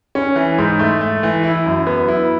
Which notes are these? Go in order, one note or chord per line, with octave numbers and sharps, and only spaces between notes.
C#4
E3
G#2
A3
A3
E3
E4
F#2
B3
E4